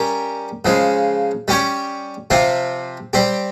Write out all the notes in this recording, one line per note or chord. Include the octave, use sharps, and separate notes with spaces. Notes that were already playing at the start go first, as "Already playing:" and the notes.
Already playing: G3 C#4 G4 A#4
C#3 F3 G#3
G3 C#4 G4 C#5
C3 F3 C4 F4
G3 C4 G4